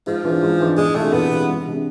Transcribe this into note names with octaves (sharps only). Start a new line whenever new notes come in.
G#2 F3
E3 G#3 D4
G#2
E3 G#3 D4
E2 G#3
C3 G#3 A3 D4 F4
E2 B3
C3 G#3 D4 F4
E1
C3 G#3 D4